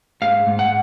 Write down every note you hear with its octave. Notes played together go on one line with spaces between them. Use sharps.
G#2 F5
G#2
F#5